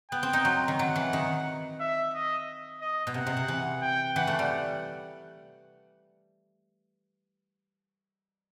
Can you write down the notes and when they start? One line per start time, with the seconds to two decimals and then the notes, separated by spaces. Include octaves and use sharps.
0.11 B3 G5
0.23 C4
0.33 D#4
0.45 F#3
0.68 D#3
0.78 F#3 F#5
0.96 E3
1.13 D#3
1.80 E5
2.14 D#5
2.81 D#5
3.07 B2
3.14 C3 F#5
3.27 C3
3.37 C3
3.48 E3
3.82 G5
4.16 E3 F#5
4.27 A3
4.39 G3